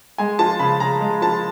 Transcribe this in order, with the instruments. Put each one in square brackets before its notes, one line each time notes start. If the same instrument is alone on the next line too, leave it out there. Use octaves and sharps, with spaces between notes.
[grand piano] G#3 G#5
F3 A5
C#3 B5
C#3 A#5
G#3
F3 A5